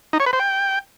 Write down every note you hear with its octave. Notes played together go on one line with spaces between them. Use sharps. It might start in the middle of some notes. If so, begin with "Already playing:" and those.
D#4
C#5
B4
C5
G5